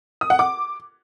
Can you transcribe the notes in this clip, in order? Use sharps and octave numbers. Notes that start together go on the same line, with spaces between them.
D#6
F#5
D6